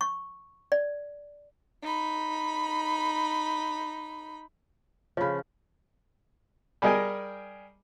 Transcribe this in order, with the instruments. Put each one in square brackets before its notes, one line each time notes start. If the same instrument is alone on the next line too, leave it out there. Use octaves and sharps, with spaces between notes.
[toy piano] C#6
D5
[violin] D#4 B5
[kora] C#3 F3 [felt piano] C#5 B5
[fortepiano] G3 G#4 A#4 D#5 G5 G#5